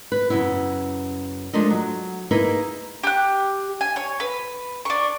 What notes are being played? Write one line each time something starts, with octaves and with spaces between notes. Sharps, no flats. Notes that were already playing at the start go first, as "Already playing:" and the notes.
B4
F#2 C#3 B3 E4
F3 G#3 A3 D4 A#4 D#5
F#3
A#3 D#4 E4 G#4 A#4 B4
G4 F#6
G#5
C#5
B4
D4 C#6